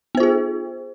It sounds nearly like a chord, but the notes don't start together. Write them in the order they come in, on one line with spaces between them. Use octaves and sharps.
B3 C5 F4 G#4